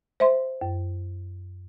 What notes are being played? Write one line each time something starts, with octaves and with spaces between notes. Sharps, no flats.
C5 E5 C6
F#2